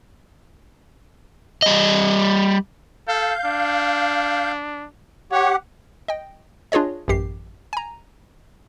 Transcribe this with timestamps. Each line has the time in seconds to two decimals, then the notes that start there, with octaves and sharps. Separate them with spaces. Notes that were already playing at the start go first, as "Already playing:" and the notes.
1.62 G3 D#5
3.08 A4 F5 G6
3.45 D4
5.32 G4 C#5 F#5
6.08 D#5 G5
6.72 D4 F4 G#4 C#5 D#5
7.08 A1 F#2 G4 C7
7.73 G#5 A#5